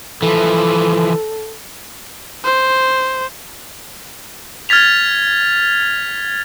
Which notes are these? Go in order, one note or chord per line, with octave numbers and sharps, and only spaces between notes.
E3 F3 A4
C5
F6 G#6 A6 B6 F7